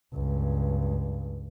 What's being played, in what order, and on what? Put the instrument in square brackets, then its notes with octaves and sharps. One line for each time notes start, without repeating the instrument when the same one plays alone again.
[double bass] C#2 G2